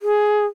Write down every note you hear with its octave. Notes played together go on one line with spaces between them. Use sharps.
G#4